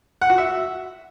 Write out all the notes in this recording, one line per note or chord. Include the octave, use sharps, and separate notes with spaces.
F#5
F#4
E5